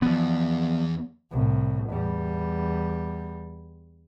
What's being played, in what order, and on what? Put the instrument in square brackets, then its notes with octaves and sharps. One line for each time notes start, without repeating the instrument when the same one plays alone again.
[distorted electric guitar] E2 [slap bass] F3 B3
[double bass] C2 A2
E2 G3